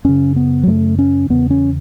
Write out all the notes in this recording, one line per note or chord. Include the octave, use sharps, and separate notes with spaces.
F#2 C#3 C#4
B3
F#3
F#2 C#3 A3
C#4
E2 C#3 B3
C#4